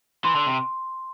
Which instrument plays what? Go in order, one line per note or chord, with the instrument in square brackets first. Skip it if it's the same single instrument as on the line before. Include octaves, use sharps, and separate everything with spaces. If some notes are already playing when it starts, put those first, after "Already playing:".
[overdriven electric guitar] E3 [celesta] C6
[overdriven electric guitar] D3
C3